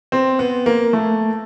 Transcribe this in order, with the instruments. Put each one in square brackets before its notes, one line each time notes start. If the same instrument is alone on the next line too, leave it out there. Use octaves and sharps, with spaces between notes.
[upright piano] C4
B3
A#3
A3